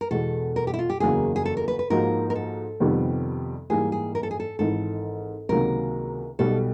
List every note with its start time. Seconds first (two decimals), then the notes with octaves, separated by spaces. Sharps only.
0.01 A#4
0.11 E2 B2 G#3 A4
0.56 A#4
0.67 G4
0.74 E4
0.79 F4
0.90 G4
1.00 F#1 E2 C#3 F#3 A#3 G#4
1.36 G#4
1.45 A4
1.57 A#4
1.68 B4
1.79 B4
1.90 G#2 F3 A#3 D#4 F#4 A#4
2.30 A#4
2.35 A4
2.80 F2 C3 D#3 G3 B3
3.70 G#2 E3 G3 A#3 G#4
3.92 G#4
4.15 A#4
4.23 A4
4.31 G#4
4.40 A4
4.59 G#1 G#2 E3 A4
5.49 C#2 C3 D#3 F#3 A#3 A#4
6.39 B1 B2 G3 A4